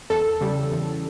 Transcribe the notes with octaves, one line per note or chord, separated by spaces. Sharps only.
E2 A4
C#3 G3
E2